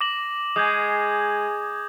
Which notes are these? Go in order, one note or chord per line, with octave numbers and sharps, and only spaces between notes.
D6 A#6 F#7
G#3 D#6 G6 G#6